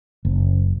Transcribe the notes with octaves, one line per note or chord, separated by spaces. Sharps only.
F#1